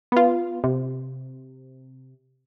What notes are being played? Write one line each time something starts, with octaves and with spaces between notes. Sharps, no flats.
B3 F4
C3